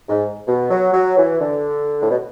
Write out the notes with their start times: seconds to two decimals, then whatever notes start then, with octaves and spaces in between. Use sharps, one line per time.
0.09 G#2
0.47 B2
0.70 F#3
0.93 F#3
1.17 E3
1.40 D3
2.01 A2
2.10 B2